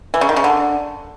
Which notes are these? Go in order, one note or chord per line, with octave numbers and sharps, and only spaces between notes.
E3
C#3
D#3
C#3
D3